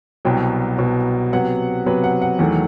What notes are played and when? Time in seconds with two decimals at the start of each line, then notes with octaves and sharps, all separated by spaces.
0.25 C2 B2 F#3 G5
0.78 C2 B2 F#3
1.33 C3 F#3 B3 F#5
1.86 C3 F#3 B3 B4
2.04 F#5
2.22 F#5
2.39 E2 D#3 F#3 A3